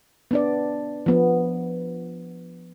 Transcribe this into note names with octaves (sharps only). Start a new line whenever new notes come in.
B3 D4 D5
F3 B3